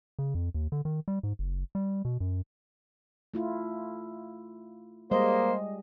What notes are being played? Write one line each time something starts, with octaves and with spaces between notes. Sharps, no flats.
C#3
F2
D#2
D3
D#3
G3
G#2
F#1
G3
B2
F#2
A3 E4 F4
G3 G#3 A#3 C5 D#5